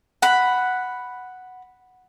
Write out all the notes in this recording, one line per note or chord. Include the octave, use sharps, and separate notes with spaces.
F#5 B5